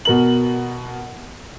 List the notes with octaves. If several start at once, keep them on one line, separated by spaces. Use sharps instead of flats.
B2 A#4 F#7